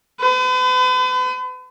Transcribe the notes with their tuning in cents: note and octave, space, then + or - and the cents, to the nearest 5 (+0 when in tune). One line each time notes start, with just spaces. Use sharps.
B4 +45